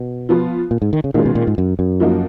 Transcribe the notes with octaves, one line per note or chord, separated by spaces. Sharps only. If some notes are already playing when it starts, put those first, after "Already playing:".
Already playing: B2
F3 B3 F4
A#2
G#2
D#3
C#3
A#2 D#3 G#3 C#4 F4
B2
A#2
G#2
F#2
F#2
F3 A#3 D#4 F#4